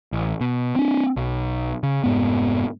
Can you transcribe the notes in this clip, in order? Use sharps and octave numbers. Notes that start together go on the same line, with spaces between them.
A1
B2
C4 D4
B1
C#3
F1 G#2 B3